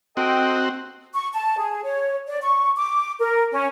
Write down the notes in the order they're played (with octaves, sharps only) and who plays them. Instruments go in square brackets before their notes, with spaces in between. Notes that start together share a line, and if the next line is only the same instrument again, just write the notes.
[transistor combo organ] C4 F#4 [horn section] A4 D#5 G5
[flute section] C#6
A5
G#4
C#5
D5
C#6
D6
A#4
C#4